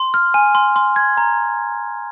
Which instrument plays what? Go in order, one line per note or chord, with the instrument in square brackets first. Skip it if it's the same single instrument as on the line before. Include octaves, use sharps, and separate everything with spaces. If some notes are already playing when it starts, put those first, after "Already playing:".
Already playing: [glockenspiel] C6
F6
G#5
C6
C6
G#6
A#5